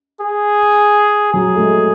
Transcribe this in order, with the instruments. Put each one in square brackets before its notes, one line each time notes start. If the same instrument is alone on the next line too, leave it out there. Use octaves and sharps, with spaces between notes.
[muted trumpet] G#4
[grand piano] F#3 [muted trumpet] G#4
[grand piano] A3
G#3